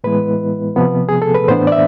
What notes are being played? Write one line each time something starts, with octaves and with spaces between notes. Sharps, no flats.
A2 E3 G#3 B3 E4 B4
C3 F3 B3
G#4
A4
B4
A2 E3 B3 D4 C5
D5
E5